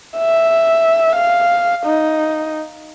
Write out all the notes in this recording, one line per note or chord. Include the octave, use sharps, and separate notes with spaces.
E5
F5
D#4